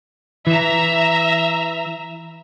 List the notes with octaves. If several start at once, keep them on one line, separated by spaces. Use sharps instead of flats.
E3 E5 A#5